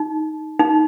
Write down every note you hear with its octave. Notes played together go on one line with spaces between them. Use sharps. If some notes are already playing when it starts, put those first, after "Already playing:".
Already playing: D#4
D#4